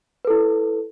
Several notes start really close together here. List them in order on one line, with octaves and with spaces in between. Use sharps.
B4 A4 E4